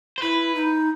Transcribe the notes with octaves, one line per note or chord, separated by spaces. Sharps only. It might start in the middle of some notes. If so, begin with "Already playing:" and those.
C5
E4 B4
D#4